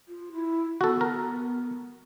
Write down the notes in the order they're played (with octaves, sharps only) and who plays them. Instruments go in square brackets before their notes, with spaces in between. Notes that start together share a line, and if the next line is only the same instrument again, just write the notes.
[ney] F4
E4
[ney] B3 [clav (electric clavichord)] F#4 A4
[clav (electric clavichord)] A#4